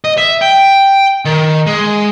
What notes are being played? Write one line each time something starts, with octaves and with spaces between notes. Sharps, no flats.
D#5
E5
G5
D#3
G#3